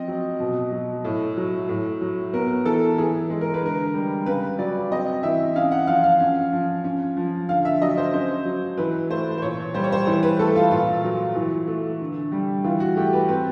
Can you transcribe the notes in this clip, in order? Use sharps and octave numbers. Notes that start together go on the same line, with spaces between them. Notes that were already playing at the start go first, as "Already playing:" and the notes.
Already playing: F3 C4 D#5
F#3
B2
F#3
A2
F#3
A2
F#3
B3 A#4
E3 A4
E3 G#4
G#3
A#4
B4
D3 A#4
G3
C#3 B4
F#3 D5
C4 D#5
E3 E5
C#4 F5
F#5
F3 F5
F5
C#4
F3
C#4
F3
D3 F5
E5
F#3 D#5
C5
C#4 C5
F#3
E3 B4
A3 C5
C5
A#2 C#5
G3 C5
C#5
C5
E3 C5
B4
A3 A4
F4
A#2 F4
F#3
E3
A3
D3
G3
E3 F4
F#4
A3 G4
B4
C4 B4